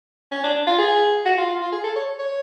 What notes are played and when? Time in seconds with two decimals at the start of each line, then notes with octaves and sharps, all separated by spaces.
0.31 C#4
0.43 D4
0.66 F4
0.79 G#4
1.25 F#4
1.38 F4
1.48 F4
1.61 F4
1.72 G#4
1.84 A4
1.96 C#5
2.19 C#5